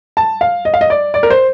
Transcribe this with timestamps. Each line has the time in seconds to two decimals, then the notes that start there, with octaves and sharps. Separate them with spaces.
0.17 A5
0.41 F5
0.65 D#5
0.74 F5
0.81 D#5
0.90 D5
1.14 D5
1.23 A#4
1.30 C5